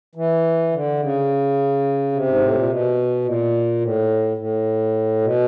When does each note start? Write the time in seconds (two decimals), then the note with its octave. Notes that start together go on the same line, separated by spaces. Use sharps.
0.15 E3
0.71 D3
1.00 C#3
2.12 C3
2.27 G#2
2.41 A2
2.55 A#2
2.68 B2
3.24 A#2
3.81 A2
4.37 A2
5.21 B2